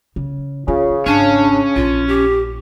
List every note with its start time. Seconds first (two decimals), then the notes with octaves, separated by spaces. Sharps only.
0.16 C#3
0.68 C#3 F4
1.06 G#1 C#4 D4
1.76 A#1 F4
2.08 G4